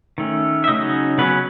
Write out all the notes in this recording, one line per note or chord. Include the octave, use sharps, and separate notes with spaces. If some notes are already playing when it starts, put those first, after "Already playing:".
D#3 A3 C#4
E5
C#3 F#3 C#4 D#4 D#5
C#3 F#3 B3 C#4 B4